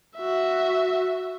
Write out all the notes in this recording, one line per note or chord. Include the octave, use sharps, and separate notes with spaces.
F#4 E5